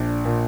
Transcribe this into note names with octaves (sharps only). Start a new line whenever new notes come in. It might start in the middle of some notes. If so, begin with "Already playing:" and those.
Already playing: A#1 D4
A#2